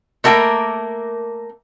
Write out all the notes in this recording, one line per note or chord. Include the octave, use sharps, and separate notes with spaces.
A3 A#3 A#4 G5